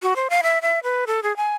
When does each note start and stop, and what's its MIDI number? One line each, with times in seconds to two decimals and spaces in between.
0.02 0.14 66
0.16 0.28 72
0.30 0.41 77
0.43 0.59 76
0.62 0.79 76
0.83 1.05 71
1.07 1.20 69
1.23 1.35 68
1.37 1.56 80